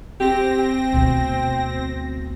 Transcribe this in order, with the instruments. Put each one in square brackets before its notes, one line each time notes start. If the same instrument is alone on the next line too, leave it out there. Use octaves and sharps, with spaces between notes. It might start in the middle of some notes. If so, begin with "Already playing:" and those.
[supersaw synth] C4 A#6 [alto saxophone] G4
[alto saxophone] G5
[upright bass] D2 B2